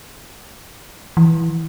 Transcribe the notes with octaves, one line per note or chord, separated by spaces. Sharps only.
E3